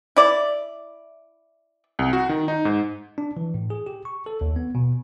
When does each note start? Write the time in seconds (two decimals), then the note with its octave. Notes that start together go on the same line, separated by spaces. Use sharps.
0.16 E4 D5
1.99 C2
2.13 F#4
2.29 D#3
2.48 D#4
2.65 G#2
3.18 D4
3.37 E3
3.54 A2
3.70 G#4
3.86 G4
4.05 C#6
4.26 A4
4.41 D#2
4.56 B3
4.75 B2